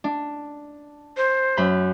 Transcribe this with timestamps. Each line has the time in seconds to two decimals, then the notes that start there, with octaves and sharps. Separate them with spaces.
0.04 D4
1.17 C5
1.57 F#2 B5 G6